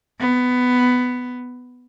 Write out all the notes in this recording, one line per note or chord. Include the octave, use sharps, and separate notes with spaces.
B3